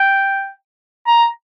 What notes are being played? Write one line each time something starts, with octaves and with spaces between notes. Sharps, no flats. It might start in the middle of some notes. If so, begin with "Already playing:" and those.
Already playing: G5
A#5